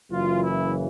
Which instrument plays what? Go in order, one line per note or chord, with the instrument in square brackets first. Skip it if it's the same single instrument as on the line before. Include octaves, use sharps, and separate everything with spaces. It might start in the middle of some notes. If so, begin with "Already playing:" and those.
[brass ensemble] F#1 F#2 C#3 E3 F4
E4